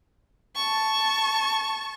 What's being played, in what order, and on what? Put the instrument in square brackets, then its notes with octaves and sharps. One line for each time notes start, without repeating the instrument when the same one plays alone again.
[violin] A5 C#6